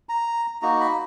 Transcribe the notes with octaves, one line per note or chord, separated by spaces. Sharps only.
A#5
A#3 D#4 F#4 A#5
B5